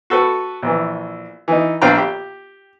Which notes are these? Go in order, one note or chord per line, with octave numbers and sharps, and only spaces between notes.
F#4 A4 B4
A#1 E3
E3 D#4
A#1 D4 B4 F5 G5 A#5
G4